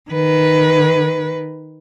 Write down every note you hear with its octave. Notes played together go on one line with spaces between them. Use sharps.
D#3 B4